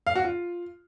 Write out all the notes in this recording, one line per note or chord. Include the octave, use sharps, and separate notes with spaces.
F5
F#4
F4